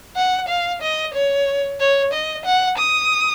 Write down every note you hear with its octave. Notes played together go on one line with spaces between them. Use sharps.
F#5
F5
D#5
C#5
C#5
D#5
F#5
D#6